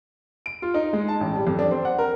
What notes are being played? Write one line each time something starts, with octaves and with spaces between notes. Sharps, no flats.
D7
F4
D#4
G#3
A5
A1
G3
F2
D4
C4
F#5
A#4